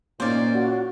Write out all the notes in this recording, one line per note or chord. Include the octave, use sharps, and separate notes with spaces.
A#2 A#3 C#4 D#4 C5 D5
F#4